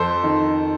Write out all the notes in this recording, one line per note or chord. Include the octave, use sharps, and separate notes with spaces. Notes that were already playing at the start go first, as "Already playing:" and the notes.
Already playing: F2 A4 C5
D#3